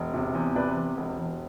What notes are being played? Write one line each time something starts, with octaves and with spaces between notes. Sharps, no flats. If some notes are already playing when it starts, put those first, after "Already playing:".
Already playing: E1
C3
E2
C3 B4 D5
E2
E1
E1